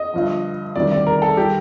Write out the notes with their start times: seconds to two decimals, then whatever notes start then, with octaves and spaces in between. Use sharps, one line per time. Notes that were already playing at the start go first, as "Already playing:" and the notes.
Already playing: D#5
0.14 G1 G2 F3
0.76 D2 C3 D#3 G3 D5
0.92 D5
1.07 A#4
1.22 A4
1.37 D#3 G3 G4